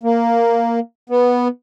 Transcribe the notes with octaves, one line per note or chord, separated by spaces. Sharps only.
A#3
B3